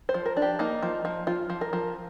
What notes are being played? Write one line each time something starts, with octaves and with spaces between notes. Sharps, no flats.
C5
F3
A#4
D4
G4
A#3 D#4
F3
F3
F3 F4
F3
A#4
F3